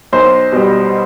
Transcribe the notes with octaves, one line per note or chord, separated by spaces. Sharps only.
B1 C5
B2 G3